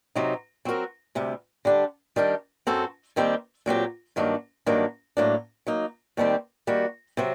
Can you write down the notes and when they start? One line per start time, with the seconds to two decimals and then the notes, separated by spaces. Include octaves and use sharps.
0.15 C3 F#3 C4 D#4
0.65 F#3 C4 F#4 A#4
1.15 D2 C3 G3
1.65 D3 G3 D4 G4
2.16 D#3 G3 D4 G4 A#4
2.67 F#2 F#3 C4 F#4 A4
3.16 D#2 D#3 G3 C4 G4
3.66 A#2 F#3 C4 G4
4.16 G2 D#3 F#3 A#3 D4
4.66 G2 D#3 F#3 A#3 D4
5.17 A2 F#3 A#3 D4
5.67 F#3 A#3 D#4
6.17 D#2 D#3 G3 C4 G4
6.67 D#3 G3 A#3 F#4
7.17 C3 F#3 C4